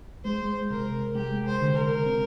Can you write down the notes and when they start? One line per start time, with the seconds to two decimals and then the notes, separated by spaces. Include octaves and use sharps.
0.25 G#3 C5
0.70 C3 A#4
1.15 G#3 G4
1.46 C5
1.61 D3
1.75 A#4
2.06 C4